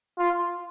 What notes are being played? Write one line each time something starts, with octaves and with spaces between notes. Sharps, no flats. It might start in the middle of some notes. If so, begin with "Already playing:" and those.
F4